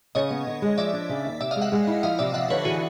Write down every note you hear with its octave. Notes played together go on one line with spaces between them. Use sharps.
C#3 C#5 D#5
B3
D3
G#3
F3 D5 E5
D4
C#3
D#2
C3 D5 E5
D#5 F5
G#3
E5 F#5
G#3
E4
F3 D#5 F5
C3 D5 E5
F3 E5 F#5
D3 B4 C#5
E3 F#4 G#4